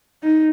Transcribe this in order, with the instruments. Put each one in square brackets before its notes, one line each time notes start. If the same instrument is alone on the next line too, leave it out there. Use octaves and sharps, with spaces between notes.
[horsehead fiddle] D#4